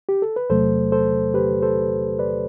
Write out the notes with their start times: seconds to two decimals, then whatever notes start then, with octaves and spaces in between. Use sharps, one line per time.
0.09 G4
0.22 A4
0.36 B4
0.50 E2 C3 F#3 A3 A4 C5
0.92 A4 C5
1.34 G4 B4
1.62 A4 C5
2.19 B4 D5